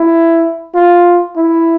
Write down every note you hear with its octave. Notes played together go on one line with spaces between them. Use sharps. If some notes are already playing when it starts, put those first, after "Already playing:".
Already playing: E4
F4
E4